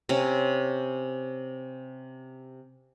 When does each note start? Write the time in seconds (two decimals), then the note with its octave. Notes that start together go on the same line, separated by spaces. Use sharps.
0.09 C3 C4 C#4